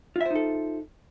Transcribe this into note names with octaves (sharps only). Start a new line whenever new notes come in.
D#4 F4 A4 C5 E5